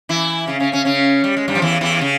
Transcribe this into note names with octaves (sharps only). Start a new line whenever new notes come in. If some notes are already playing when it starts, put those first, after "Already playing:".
E3 E4
C#3 C#4
C#3 C#4
C#3 C#4
C#3 C#4
G3
G#3
G2 G3
F3
E2 E3
E2 E3
C#3